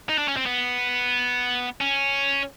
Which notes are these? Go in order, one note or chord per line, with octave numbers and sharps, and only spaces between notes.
D#4
D4
C#4
C4
B3
C#4